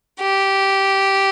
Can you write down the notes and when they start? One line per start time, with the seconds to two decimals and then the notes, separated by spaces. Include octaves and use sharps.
0.21 G4